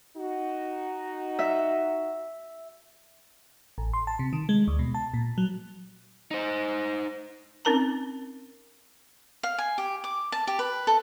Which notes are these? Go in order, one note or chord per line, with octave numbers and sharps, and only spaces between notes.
D#4 F#4
E5
A1
C6
A5
C3
D#3
G#3
D2
B2
A5
A#2
F#3
D#4 C5
C4 C#4 D#4 A#4 A5 A#5
F5
G#5
G4
D6
A5
G4
B4
A4